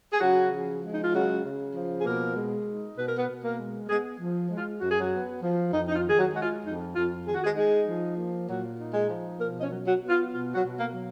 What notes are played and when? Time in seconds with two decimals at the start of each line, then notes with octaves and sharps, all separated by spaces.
0.12 G#4
0.21 C#3 F#3 F#4
0.52 F3
0.83 G#3
0.91 D#4
1.02 F4
1.13 C#3 F#3 F#4
1.44 C#3
1.74 F3
1.98 G#4
2.05 B2 A#3 A#4
2.35 G#3
2.67 D#4
2.97 B2 B4
3.07 A#4
3.17 B3 B4
3.28 B2
3.43 A#3 A#4
3.58 G#3
3.89 G#3 B3 G#4
4.19 F3
4.50 G#3
4.57 F4
4.81 F#2 F#4
4.90 G#4
4.99 F#3 F#4
5.12 B3
5.42 F3
5.73 F2 D#4
5.88 D#4
5.96 F4
6.03 D#3
6.09 G#4
6.18 F#3 F#4
6.34 G#3 F#4
6.41 F4
6.64 F2 D#4
6.95 F2 F4
7.26 D#3 G#4
7.35 F#4
7.44 G#3 G#4
7.56 G#3 D#4 G#4
7.86 F3
8.17 A#3
8.48 A#2 F#3 F#4
8.79 D#4
8.94 G#3 G#4
9.09 F3
9.40 B2 A#3 A#4
9.58 D#5
9.63 C#4 C#5
9.71 F#3
9.85 F#3 F#4
10.01 B3
10.09 F4
10.32 B2 F4
10.55 F#3 F#4
10.63 B2
10.78 A#3 A#4
10.93 F#3